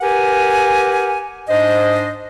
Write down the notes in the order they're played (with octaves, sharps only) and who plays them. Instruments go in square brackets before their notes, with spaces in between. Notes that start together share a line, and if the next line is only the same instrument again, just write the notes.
[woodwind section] G4 A#4 B4 F#5 G#5
G#2 D4 C5 D#5